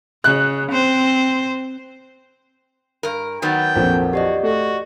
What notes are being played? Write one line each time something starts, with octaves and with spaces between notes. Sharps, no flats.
C#3 F#6
C4 C5
G2 A#4
D#3 F#3 B3 F#5 G5 A6
A#1 F2 A4 A#4
F#4 G4 D5 D#5
A3 F#4